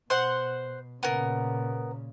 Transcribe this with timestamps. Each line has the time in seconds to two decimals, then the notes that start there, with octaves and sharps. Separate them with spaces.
0.10 B2 C5 F#5
1.03 A#2 C#3 B3 A#4